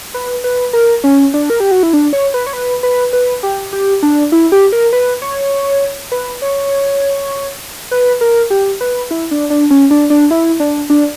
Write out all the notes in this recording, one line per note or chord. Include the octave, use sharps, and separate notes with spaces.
B4
B4
A#4
C#4
D4
A#4
G4
F#4
E4
D4
C#5
B4
C#5
B4
B4
B4
G4
G4
D4
E4
G4
A#4
B4
C#5
B4
C#5
B4
A#4
G4
B4
E4
D4
D4
C#4
D4
D4
E4
D4
D4